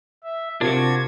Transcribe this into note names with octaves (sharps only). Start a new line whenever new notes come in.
E5
C3 D4 F4 F#4 A#4 G#6